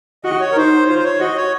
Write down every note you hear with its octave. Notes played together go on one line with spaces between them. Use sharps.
F#4 D#5
C#5
A#4
D#4 C5
F4 C5
C5
C#5
F#4 D#5
C#5